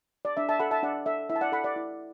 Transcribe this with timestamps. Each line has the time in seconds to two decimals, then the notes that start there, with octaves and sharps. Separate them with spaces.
0.25 D5
0.37 D4 E5
0.49 E5 A5
0.59 A4 F#5 B5
0.71 E5 A5
0.83 D4 D5 F#5
1.06 A4 E5
1.29 E4 E5
1.36 A5
1.41 D5 F#5
1.52 A4 F#5 B5
1.64 D5 F#5
1.76 E4